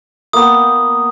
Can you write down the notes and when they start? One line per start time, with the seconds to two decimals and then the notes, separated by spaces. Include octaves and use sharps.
0.33 A#3 B3 G5 D#6